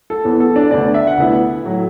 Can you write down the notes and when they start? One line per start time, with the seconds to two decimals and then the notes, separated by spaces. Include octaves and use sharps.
0.10 A4
0.25 E2 E3 B3
0.40 A4
0.56 D4 D5
0.71 D2 D3 B3 D4 D5
0.94 E5
1.07 F#5
1.18 D2 D3 B3 E4 E5
1.64 A2 F#3 A3